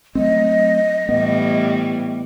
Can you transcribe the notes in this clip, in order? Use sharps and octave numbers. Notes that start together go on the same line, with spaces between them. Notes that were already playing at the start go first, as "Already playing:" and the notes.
F#3 A3 C4 D#5
A2 E3 G3 B3